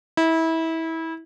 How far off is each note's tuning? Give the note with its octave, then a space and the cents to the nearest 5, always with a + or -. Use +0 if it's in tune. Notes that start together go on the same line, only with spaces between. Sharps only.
E4 -25